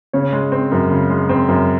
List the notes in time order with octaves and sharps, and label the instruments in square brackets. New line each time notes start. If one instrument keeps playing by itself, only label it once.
[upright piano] C#3 C#5
G#3
C4
F#2
C#3
G#3
C4
F#2